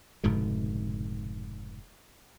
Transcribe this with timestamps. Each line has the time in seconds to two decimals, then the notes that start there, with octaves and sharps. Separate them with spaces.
0.24 F1 G#2 B2 D3